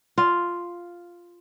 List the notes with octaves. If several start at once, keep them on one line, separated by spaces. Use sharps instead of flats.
F4